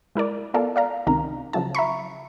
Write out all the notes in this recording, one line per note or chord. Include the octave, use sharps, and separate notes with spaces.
G#3 E4 A#4 D5
B3 F4 A4 A#4 D5 F5
D5 F5 A#5
C#2 C3 D#3 A#4 A#5
C#3 F3 F#3 E4 A5
E5 A#5 B5 C#6